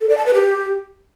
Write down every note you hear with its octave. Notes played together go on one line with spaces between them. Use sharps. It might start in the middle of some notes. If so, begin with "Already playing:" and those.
A4
D5
A5
B4
G4